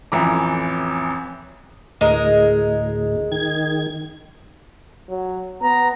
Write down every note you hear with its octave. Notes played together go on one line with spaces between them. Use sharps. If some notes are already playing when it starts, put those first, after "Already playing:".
A1 F2 E3 A#5 D6
D2 A2 G#3 A#4
D#3 G#6
F#3
B3 A#5